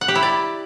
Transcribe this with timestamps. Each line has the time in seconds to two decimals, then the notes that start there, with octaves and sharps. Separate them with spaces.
0.01 F#5
0.08 G4
0.16 E4
0.23 D5